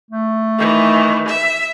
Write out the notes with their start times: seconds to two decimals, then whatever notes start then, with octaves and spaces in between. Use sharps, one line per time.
0.11 A3
0.58 D#3 E3
1.28 E5